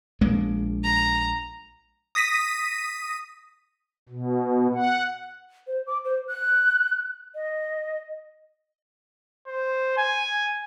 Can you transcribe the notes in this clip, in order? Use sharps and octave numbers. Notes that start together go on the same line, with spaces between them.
A#1 G#3 A#3
A#5
D#6 A#6 B6 D#7
B2
F#5
C5
D6
C5
F#6
D#5
C5
G#5